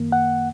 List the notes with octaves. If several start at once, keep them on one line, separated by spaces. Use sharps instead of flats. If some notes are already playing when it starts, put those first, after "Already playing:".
Already playing: F#2 D#3 A#3
F#5